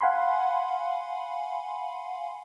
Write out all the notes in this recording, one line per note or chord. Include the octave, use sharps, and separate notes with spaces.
F5 F#5 G#5 B5 C6